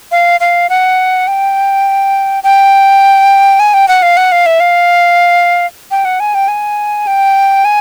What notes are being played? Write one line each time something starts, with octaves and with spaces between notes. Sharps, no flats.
F5
F5
F#5
G5
G5
G#5
G5
F#5
F5
F#5
F5
E5
F5
G5
F#5
G#5
G5
G#5
G5
G#5